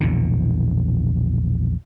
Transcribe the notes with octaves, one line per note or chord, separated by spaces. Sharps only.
A#1 E2 B2 D3